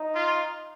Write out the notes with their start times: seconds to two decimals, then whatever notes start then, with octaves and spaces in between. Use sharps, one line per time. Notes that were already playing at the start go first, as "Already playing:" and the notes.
Already playing: D#4
0.15 F4